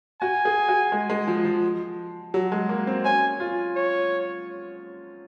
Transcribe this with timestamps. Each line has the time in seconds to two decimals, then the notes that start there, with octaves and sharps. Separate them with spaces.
0.21 F#4 G#5
0.45 G#4
0.69 F#4
0.92 G#3
1.10 G#3
1.27 F3
1.45 F3
2.34 F#3
2.52 G#3
2.69 A#3
2.87 C4
3.05 C#4 G#5
3.40 F4
3.76 C#5